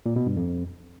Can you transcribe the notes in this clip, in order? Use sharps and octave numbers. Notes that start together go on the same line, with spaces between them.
A#2
B2
G2
F2